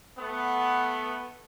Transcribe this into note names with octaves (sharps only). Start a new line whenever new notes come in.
A3 B3